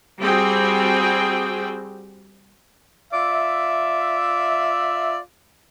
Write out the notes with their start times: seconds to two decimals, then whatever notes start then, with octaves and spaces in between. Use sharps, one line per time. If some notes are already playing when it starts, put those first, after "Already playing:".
0.21 G3 C4 F#4 G#4 G5
3.13 F4 D5 E5